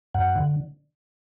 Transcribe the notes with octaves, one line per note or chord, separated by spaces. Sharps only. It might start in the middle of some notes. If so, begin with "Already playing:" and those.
F#2 F#5
D3